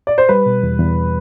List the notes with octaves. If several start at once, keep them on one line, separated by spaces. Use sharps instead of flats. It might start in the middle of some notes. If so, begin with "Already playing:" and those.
D5
C5
G3 B4
B2
E2
E2